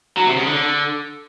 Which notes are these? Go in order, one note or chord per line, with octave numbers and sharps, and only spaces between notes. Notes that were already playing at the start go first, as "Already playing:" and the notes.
F#3
C3
C#3
D3